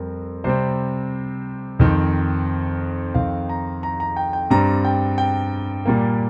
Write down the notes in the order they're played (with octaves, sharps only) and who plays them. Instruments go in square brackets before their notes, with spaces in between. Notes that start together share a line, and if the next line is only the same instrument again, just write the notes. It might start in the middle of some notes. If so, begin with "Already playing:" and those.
Already playing: [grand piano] F2 G3 C4 A#4
C3 G3 C4 C5
F2 D#3 C4
F2 D#3 C4 F5
A#5
A#5
A#5
G5
G5
G2 G3 C4 A#5
G5
G5
A#2 G3 A#3